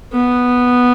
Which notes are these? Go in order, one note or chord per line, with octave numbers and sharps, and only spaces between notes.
B3